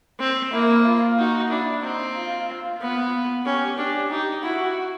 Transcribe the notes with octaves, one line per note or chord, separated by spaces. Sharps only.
C4
A#3 E4
F4
D#4 F#4
D4 E4
C4 D#4
F4
F4
B3
C#4 G4
D4 G4
D#4 G4
E4 F#4